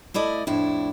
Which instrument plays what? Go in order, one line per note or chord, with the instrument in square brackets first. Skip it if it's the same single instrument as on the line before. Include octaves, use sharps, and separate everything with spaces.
[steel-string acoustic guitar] A3 E4 D5 D#5
F2 A2 D4 E4